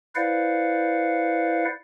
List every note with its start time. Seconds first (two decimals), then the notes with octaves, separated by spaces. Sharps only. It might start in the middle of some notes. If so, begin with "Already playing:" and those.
0.15 E4 B4 C5 D5 F5 F#5